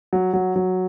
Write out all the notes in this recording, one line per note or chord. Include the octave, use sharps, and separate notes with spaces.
F#3
F#3
F#3